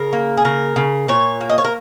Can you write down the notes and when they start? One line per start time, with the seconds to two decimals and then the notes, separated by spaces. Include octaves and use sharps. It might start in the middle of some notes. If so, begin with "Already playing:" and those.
Already playing: C#3 A#4
0.13 A#3
0.37 G#4
0.45 C#3 A#4
0.76 C#3
1.08 A#2 C#5
1.41 A#3
1.49 D#5
1.58 C#5
1.64 A#4